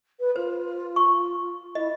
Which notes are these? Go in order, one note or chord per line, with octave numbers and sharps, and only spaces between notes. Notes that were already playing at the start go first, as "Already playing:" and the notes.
B4
F4 C5
C#6
E4 D#5